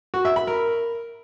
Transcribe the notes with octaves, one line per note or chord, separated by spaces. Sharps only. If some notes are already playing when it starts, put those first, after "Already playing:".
F#4
E5
B5
A#4